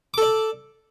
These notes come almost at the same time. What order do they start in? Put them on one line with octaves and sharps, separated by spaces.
D6 A4 D5